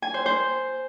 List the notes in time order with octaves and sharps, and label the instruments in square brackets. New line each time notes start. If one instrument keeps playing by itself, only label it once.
[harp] G#5
C5
C5